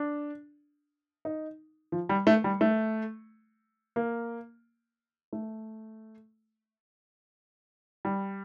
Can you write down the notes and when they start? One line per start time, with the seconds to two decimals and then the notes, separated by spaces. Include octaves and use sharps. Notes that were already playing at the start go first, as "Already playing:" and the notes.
Already playing: D4
1.25 D#4
1.92 F3
2.09 G3
2.27 A3
2.44 G3
2.61 A3
3.96 A#3
5.33 A3
8.05 G3